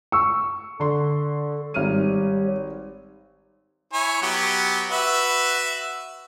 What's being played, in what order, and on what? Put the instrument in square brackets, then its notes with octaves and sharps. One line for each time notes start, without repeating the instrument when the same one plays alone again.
[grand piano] C#6 E6
[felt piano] D3 C6 [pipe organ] A4
[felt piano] G#1 F6 D#7 [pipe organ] G3 G4 C#5
[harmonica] E4 C#5 G#5
F#3 B3 G4
F#4 B4 E5